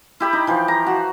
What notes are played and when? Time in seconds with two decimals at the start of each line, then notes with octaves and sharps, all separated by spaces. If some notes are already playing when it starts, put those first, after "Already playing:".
0.20 E4 G4 B5
0.33 D#4
0.47 E3 F3
0.68 A#5
0.87 F#4